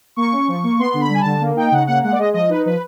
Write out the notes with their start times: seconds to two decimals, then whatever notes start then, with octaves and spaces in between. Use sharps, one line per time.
0.16 A#3 C#6
0.32 C#4
0.48 F3
0.63 A#3
0.79 B3 C6
0.94 D3
1.00 B5
1.09 G3 G#5
1.20 D3 A5
1.41 A#3
1.56 D#4 G5
1.72 C#3 F#5
1.87 A#3 F#5
2.02 G#3 F#5
2.12 D5
2.19 G#3 D#5
2.34 F3 D#5
2.49 D#4 B4
2.66 F3 B4